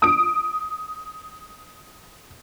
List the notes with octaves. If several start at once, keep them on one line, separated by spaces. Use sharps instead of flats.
D#6 D7